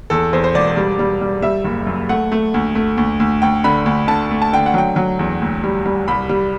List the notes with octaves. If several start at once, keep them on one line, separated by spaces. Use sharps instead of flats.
E2 A4
E2 C5
C5
E1 D5
G3
G3
G3
G3 E5
F#1
F#2
A3 F#5
A3
D2
A3
D2
D2
D2 G5
D3 B5
D2
D3 A5
A3
A5
D3 G5
F#5
F#3 G5
F#3
E2
D2
G3
G3
C2 B5
G3